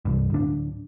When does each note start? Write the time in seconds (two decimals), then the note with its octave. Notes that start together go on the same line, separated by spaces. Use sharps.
0.05 C2 G2
0.30 D1 D4